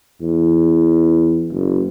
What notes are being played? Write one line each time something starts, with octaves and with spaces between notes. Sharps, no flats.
E2
F#1